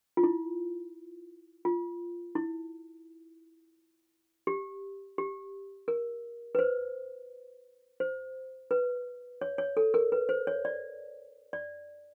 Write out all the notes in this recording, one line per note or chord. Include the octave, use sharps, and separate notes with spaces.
F4
E4
F4
E4
G4
G4
A#4
B4
C5
C5
B4
C#5
C#5
A4
A#4
B4
C5
C#5
D5
D5